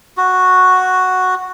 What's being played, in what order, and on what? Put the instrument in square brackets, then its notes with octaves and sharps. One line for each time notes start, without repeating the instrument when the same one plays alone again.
[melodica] F#4